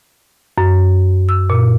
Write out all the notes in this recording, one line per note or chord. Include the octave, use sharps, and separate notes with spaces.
F#2
E6
A#2